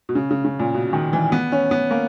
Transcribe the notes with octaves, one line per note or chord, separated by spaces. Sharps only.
B2
C#3
C#3
C#3
A#2
B2
D#3
E3
B3
C#4
B3
A#3